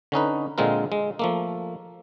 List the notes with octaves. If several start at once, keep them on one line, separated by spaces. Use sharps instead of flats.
D3 C#4 D#4 B4
A#2 D3 G#3 C4 F4 A#4
G#3
F3 A3 A#3